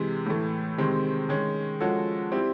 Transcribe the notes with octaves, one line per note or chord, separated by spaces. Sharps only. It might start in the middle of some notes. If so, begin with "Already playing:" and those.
Already playing: C3 E3 G#3
A2 E3 A3
C3 D#3 G#3 C4
D#3 G#3 C#4
F3 G#3 C#4 F#4 A4
G3 C4 E4 G4